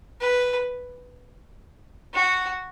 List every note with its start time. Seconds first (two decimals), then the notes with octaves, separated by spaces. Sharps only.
0.21 B4
2.14 F#4